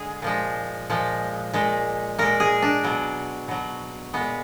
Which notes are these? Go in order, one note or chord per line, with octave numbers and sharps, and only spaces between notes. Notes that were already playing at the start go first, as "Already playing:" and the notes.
Already playing: D3 G#3 G#4
A#2 F3 G#3
A#2 F3 G#3
A#2 G#3
A#2 G#3 A#4
G#4
D4
B2 F#3
B2 F#3
A#2 G#3 B3